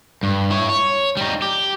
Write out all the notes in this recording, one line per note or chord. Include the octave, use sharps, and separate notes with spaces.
G2
E4 C#5
C#5
G3 D#4
G4